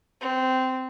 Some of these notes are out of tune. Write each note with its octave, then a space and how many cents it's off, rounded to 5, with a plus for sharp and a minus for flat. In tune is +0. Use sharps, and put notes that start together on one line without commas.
C4 -15